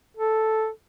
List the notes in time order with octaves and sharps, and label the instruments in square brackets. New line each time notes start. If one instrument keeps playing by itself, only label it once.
[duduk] A4